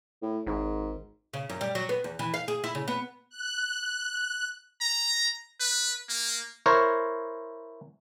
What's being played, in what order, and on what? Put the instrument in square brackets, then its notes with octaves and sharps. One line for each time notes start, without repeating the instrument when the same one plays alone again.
[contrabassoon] A2
[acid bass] G#1 [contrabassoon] G#2
[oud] C#3
F#2
G3
F#3
B3
E2
E3
F5
G#4
E4
C#3
B3
[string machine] F#6
[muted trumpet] A#5
B4
A#3
[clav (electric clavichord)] E4 A#4 C5 C#5